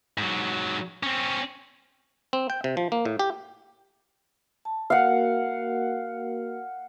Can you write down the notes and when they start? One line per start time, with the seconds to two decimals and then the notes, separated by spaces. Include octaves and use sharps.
0.18 G#2 F#3
1.03 C4 C#4
2.33 C4
2.50 G5
2.64 C3
2.77 F3
2.92 A#3
3.05 A2
3.19 G4
4.65 A5
4.90 A#3 F#4 A#4 F5 F#5